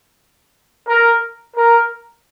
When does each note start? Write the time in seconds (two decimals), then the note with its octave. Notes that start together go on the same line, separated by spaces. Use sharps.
0.88 A#4
1.57 A#4